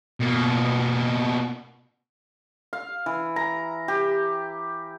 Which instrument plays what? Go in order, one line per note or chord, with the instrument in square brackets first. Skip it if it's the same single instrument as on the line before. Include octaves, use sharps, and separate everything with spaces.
[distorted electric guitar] B2 A#3
[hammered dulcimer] F5
E3
A#5
G4